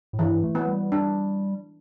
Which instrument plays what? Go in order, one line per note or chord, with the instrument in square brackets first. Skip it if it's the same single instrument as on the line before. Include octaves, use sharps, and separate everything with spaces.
[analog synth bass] A2
[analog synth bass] G2 [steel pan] E3
[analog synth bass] A3
[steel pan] B3
[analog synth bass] G3
[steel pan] D4